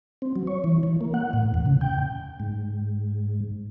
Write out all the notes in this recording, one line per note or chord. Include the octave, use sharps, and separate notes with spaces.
C4
F#3
C#5
E3
E3
A#3
F#5
A2
E2
C#3
G5
G#2